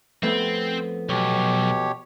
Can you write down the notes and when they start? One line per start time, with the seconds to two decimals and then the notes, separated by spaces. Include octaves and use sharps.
0.23 F2 A3 B3 C4
1.09 B1 B2 G4 C#5